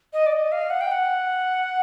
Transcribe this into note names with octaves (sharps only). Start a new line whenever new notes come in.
D#5
D5
D#5
F5
F#5
G5
F#5